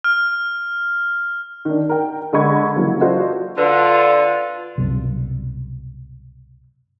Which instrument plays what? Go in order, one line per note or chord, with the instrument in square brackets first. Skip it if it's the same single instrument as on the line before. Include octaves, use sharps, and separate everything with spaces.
[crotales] F6
[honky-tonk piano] D#3 D4
A#4 G5
D3 G#3 D#5 B5 C#6 G#6
C#3 E3 F#3 A#3
F4 F#4 A4 C5 D5 D#5
[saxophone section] D3 [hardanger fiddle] F4 [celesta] B4
[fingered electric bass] C2 F#2 B2